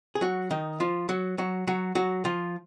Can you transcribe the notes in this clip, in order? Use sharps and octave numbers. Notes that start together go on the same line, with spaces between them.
G#4
F#3 F#4
D#3 D#4
F3 F4
F#3 F#4
F#3 F#4
F#3 F#4
F#3 F#4
F3 F4